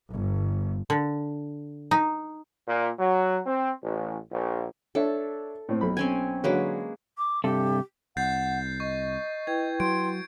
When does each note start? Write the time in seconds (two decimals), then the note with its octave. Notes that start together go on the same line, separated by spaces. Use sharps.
0.11 G1
0.90 D3
1.91 D#4
2.68 A#2
2.99 F#3
3.47 C4
3.83 A1
4.31 A#1
4.95 D4 A4 C#5 E5
5.69 A2 C4
5.81 B1 B5
5.97 C4 C#4 G#5
6.44 D3 F#3 G#3 A#3 B4 C#5
7.18 D6
7.44 G2 C3 G4 A4
8.17 C2 F#5 G6 A6 C7
8.80 D#5 C#6
9.47 E4 B4 G5 G#6
9.80 F#3 C6 D7